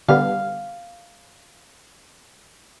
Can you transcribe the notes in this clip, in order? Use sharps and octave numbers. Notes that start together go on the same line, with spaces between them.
D3 G3 B3 F5